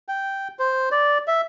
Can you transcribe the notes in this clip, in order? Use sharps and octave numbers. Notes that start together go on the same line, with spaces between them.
G5
C5
D5
E5